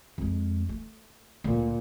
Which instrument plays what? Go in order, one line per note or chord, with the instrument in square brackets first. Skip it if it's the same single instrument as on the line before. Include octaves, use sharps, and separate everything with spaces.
[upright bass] F2 G#3
A3
[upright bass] D2 [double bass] A#2